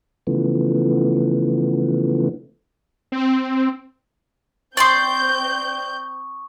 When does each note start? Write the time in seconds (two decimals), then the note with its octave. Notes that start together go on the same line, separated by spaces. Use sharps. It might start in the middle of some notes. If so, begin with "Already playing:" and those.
0.27 C#3 E3 F3 A3 B3
3.12 C4
4.77 C4 D5 G5 C6 C#6 D#6 G6